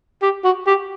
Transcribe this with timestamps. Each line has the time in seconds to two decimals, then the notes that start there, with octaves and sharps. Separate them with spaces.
0.22 G4
0.44 F#4
0.67 G4